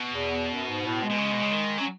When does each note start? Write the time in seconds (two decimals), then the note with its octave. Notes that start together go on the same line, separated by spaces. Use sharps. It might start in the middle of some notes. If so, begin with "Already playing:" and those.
Already playing: B2
0.13 E2
0.53 F#2
0.69 G#2
0.85 A2
1.02 G#3
1.10 B2
1.18 C#3
1.32 B2
1.42 C#3
1.51 D#3
1.78 F#3
1.80 C#4